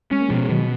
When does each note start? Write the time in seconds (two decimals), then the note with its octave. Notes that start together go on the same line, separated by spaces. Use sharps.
0.11 G#3 C#4
0.21 A#3
0.29 B2 F3 G#3
0.44 G#3
0.49 B2 D#3 F#3